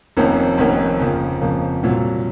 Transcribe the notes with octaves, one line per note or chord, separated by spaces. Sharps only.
F1 F2 D#3 A#3 C#4
F1 F2 D#3 A#3 C#4
F2 C#3 F3 A#3
F2 C#3 F3 A#3
C2 A#2 F#3